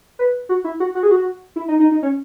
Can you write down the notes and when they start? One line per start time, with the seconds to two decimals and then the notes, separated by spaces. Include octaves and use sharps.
0.19 B4
0.49 F#4
0.64 E4
0.80 F#4
0.95 F#4
1.03 G#4
1.11 F#4
1.56 E4
1.68 D#4
1.79 D#4
1.92 D#4
2.02 C#4